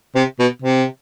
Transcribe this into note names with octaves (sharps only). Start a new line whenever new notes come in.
C3
B2
C3